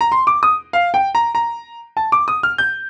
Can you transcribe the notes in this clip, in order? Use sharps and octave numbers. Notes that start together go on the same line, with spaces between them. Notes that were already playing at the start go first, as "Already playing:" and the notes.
A#5
C6
D6
D#6
F5
G5
A#5
A#5
A5
D6
D#6
F6
G6